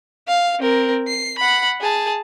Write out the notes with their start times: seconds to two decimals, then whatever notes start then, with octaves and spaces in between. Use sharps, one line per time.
0.28 F5
0.60 C4 A#4
1.08 C7
1.38 F#5 B5
1.81 G#4 A5